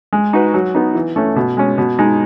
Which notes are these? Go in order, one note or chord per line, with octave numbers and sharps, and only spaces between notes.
G#3
D#4 F#4 B4
F#3
B3 D#4
E3
A3 C#4
B2
G#3 C#4
B2
G#3 D#4